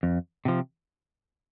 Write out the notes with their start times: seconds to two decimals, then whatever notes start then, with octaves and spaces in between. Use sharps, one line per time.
0.03 F2
0.45 C3 F3